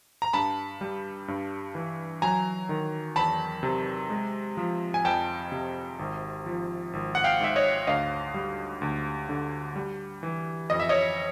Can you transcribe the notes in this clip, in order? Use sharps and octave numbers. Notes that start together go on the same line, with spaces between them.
A#5
G2 A5 B5
G3
G2
E3
F#3 G#5 A#5
D#3
E2 A5 B5
C3
G#3
F3
G#5
F2 G5 A5
C3
G#1
F3
G#1
F#5
F5 G5
G#2 E5
C#5 D#5
D2 D#5 F5
G3
D2
D3
G3
E3
F2 D#5
E5
C#5 D#5